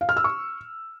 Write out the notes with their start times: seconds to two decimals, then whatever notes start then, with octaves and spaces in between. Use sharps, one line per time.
0.01 F5
0.09 F6
0.17 E6
0.24 C#6